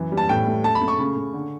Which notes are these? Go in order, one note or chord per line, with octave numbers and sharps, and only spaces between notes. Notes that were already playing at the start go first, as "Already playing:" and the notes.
Already playing: F#2 E3
G3
A5
A2 G5
A3
A3 A5
B5
A3
C#6
C#3
C#3
D3